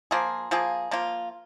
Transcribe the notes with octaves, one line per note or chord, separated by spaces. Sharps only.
F3 A#3 F4 G#4
F3 A#3 F4 G#4
F3 A#3 F4